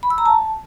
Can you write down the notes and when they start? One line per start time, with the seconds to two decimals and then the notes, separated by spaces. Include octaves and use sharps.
0.03 B5
0.10 E6
0.18 A#5
0.26 A5